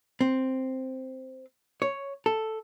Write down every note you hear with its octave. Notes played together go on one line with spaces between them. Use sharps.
C4
C#5
A4